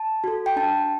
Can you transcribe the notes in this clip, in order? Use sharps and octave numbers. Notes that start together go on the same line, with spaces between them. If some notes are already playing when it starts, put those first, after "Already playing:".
Already playing: A5
F#4 A4
G5
D4 A5